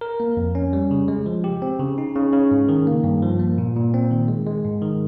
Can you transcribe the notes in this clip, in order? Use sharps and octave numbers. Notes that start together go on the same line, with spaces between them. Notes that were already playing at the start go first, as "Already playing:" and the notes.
A#4
A#3
F2
C#4
G3
C#3
G#3
F3
G4
C4
C#3
D#4
C#3
C#3
G#2
D#3
A#3
G2
F3
A#3
A#2
A#2
C4
D#3
G#3
G#3
G#2
D#3